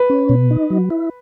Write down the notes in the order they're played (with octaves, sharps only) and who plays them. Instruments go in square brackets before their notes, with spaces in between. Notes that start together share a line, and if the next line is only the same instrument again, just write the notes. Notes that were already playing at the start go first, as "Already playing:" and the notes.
Already playing: [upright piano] B4
[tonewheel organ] C#4
B2
D#4
F#3
E4